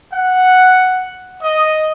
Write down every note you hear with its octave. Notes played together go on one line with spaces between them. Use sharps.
F#5
D#5